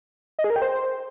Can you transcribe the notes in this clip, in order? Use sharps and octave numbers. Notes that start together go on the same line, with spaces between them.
D#5
G#4
A#4
G5
C5